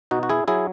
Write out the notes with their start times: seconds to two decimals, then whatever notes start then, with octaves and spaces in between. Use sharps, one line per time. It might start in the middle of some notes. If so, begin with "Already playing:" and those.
0.11 B2 D#4 F#4
0.23 F#4
0.29 E4 G#4
0.48 F#3 E4 G#4